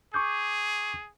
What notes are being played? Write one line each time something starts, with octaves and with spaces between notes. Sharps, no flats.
G#4 C#6 D6 G6